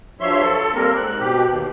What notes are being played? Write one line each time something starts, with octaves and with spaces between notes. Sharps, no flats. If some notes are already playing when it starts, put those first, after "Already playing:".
G2 F3 F#3 C#5 E5 C6
A4
G3 A#3 C4 A#4
G#2 F#6
B2 G4
D#2